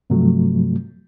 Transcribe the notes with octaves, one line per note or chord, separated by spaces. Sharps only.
G2 C3 F3 F#3 A3